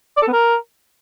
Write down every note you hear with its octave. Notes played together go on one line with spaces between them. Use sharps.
D5
A4
B3
A#4